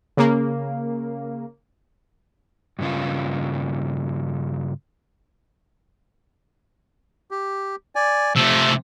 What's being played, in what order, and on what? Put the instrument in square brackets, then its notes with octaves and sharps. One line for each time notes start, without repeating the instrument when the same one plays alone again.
[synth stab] C#3 A#3
[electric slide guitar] G2 C#3 F4
[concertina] G4
D5 G#5
[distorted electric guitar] C3 A3 [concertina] E6